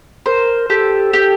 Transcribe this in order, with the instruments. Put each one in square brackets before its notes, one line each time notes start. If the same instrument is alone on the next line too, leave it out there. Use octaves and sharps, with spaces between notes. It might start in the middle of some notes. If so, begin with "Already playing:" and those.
[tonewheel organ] A#4 [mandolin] C5
[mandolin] G4 [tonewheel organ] A4
[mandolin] G4